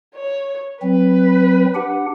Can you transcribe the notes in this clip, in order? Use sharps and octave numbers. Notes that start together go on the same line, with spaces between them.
C#5
F#3 C4 B4
D4 G4 F#5